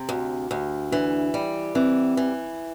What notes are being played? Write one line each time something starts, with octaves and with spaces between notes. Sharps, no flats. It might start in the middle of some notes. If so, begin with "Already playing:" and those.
Already playing: C3
D2
D2
E3 D4
G3
E3 C4
E3